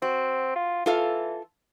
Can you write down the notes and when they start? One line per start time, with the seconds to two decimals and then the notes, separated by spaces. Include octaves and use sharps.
0.02 C4 F#4
0.56 F4
0.86 E3 F4 A4 F5